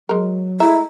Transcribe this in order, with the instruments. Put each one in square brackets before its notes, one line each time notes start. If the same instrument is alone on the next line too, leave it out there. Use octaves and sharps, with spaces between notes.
[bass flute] F#3 [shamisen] G#3 A#4
[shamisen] G#3 A3 E5 [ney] E4 [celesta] A#5